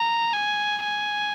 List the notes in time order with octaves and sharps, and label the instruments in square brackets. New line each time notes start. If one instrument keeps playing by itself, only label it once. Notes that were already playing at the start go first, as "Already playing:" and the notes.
Already playing: [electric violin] A#5
G#5
G#5